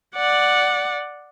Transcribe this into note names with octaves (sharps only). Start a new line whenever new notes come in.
D5 F#5